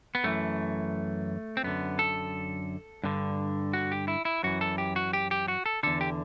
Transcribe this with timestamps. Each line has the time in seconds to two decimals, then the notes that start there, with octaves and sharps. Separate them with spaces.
0.15 B3
0.24 F#2 E3 A3
1.57 C4
1.63 F#2 D3 B3
1.99 A4
3.03 G2 D3
3.73 F#4
3.92 G4
4.08 E4
4.25 E4
4.44 F#2 E3 F#4
4.61 A4
4.78 G4
4.96 F#4
5.13 G4
5.31 G4
5.48 F#4
5.66 A4
5.83 E2 D3 A4
6.01 G4